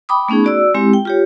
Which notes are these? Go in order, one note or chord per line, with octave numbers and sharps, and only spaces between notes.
G5 B5 D6 D#6
A3 B3 C#4 D#4 G#4
F#4 D5 E6
G#3 C4 E4 G4
G5
F4 G4 C#5